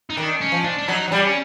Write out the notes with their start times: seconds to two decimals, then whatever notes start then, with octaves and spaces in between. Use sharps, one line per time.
0.10 D#4
0.16 D#3 D4
0.41 C#4
0.52 F3
0.64 D4
0.79 D4
0.88 F#3 D#4
1.08 F#3
1.12 G3 D4
1.26 C#4